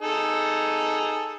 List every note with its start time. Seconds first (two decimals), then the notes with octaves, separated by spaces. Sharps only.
0.02 D#4 G#4 A4